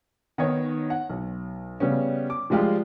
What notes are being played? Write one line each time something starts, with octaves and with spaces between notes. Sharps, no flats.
D#3 B3 D#4 C#5
F#5
B1
C#3 G3 B3 C#4
D6
F3 G3 G#3 F4 G4